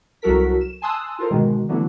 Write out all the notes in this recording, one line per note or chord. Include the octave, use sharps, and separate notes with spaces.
C2 F#3 F#4 A4 A#4 B6
E7
G#5 A5 C6 D#6 E6 F#6
F4 A4 A#4 C5
G#2 B2 D3 D#3 G#3
D3 E3 F#3 A3 B3